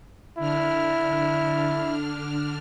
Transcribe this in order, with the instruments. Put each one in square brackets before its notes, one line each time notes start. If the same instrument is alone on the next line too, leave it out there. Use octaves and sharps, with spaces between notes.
[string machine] D3 D4 F6 [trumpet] E4